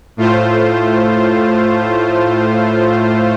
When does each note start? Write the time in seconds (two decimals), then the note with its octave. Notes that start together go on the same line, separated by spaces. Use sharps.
0.17 A2 A3 F4 C5